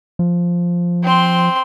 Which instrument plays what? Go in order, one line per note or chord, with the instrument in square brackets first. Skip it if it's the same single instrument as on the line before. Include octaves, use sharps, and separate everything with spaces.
[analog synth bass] F3
[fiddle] C4 C6